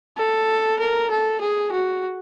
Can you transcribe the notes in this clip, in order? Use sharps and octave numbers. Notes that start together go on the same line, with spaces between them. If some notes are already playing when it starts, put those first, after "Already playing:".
A4
A#4
A4
G#4
F#4